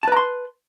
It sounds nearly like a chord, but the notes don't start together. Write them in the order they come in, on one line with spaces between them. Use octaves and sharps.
A5 B4 A#5 C6